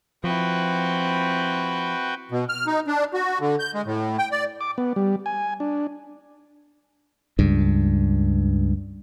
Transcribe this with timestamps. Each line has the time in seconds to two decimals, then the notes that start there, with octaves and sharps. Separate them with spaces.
0.24 F3 C4 E4 F#4 B4 G5
2.32 B2
2.49 F6
2.67 D#4
2.87 D4
3.14 F#4
3.41 D3
3.59 G6
3.74 G#3
3.86 A2
4.18 G5
4.32 D5
4.61 D6
4.78 B3
4.96 G3
5.26 G#5
5.60 D4
7.39 C#2 G2